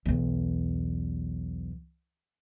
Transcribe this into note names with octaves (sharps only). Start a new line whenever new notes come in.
B1 E2